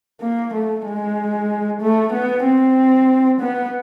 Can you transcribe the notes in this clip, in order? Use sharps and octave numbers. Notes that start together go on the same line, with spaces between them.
A#3
A3
G#3
A3
B3
C4
B3